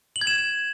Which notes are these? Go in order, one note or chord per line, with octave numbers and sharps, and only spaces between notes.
F#7
G#6
E7